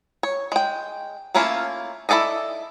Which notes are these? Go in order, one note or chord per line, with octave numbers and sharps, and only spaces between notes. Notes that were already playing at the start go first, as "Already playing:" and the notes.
C#5
G#3 G5
A3 A#3 C#4 E4 F4
E4 G#4 A4 D5 D#5